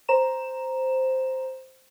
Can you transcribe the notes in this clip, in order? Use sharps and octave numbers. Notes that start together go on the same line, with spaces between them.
C5 A#5 E7